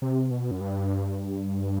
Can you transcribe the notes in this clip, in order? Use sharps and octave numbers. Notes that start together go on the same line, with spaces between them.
C3
B2
F#2
G2